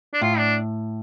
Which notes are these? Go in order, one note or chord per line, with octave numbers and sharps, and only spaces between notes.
D4
A2 F4
D4